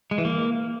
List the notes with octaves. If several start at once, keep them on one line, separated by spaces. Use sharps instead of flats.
G#3
E3
A#3